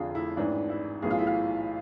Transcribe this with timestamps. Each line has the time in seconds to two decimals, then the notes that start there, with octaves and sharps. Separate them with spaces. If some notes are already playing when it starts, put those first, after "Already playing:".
Already playing: F1 F2 D3 F4 G#4
0.15 E4
0.37 A1 G#2 E3 D4
0.70 E4
1.02 B1 A2 E3 G#4
1.10 F4
1.19 E4
1.27 F4